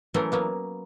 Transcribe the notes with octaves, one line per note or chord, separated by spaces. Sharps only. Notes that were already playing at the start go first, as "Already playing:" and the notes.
E3 F#3 A3 C#4 A#4 C5
F#3 A#3 B3